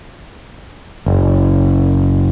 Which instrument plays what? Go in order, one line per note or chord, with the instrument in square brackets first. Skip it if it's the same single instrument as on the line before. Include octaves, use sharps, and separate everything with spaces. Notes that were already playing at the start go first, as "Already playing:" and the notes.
[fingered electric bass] F#1